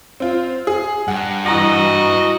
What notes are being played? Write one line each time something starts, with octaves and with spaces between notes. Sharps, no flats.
C4 F4
G#4
G2 F#5
E3 F#4 D#5 A#5 A#6